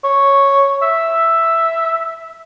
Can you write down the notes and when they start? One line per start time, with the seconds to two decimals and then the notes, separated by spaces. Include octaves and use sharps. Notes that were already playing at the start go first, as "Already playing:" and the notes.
0.04 C#5
0.82 E5